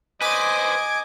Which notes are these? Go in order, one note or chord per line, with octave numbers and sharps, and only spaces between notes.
B4 C5 D#5 G#5 D6